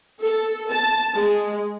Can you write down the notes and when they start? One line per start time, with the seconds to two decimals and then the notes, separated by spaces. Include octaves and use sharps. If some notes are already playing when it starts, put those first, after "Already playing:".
0.23 A4
0.71 A5
1.16 G#3